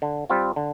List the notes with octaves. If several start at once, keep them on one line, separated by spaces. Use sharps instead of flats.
D3
G3 C4 F4
D3